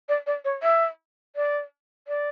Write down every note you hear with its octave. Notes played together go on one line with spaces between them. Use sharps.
D5
D5
C#5
E5
D5
D5